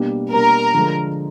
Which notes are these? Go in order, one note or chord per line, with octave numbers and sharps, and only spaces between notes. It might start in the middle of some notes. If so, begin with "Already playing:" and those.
Already playing: B2 G3 A#3 D4
B2 G3 A#3 D4 A#4
D3 F3 G#3